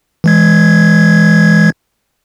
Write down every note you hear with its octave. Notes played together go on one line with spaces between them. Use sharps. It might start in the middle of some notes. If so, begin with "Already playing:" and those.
E3 G#3 G#6